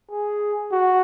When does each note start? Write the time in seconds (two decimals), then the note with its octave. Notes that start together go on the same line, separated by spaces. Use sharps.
0.11 G#4
0.71 F#4